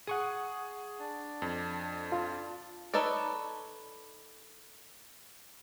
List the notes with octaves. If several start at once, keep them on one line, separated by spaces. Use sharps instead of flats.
G#4 F#5 C#6 D#6
D4
F2
F4
D#4 A4 B4 C#5 D5